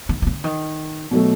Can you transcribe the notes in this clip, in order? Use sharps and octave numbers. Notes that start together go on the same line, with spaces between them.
D#3
D#3
D3
D#3
B2 F#3 A3